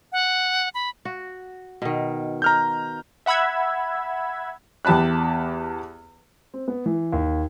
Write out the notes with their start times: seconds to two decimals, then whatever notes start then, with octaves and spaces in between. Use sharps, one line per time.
0.12 F#5
0.75 B5
1.05 F#4
1.82 B2 D#3
2.42 A#5 F6 G6
3.26 E5 F#5 B5 E6 G#6
4.85 E2 G4 A5 B5 F#6
6.54 C4
6.68 B3
6.86 E3
7.13 D#2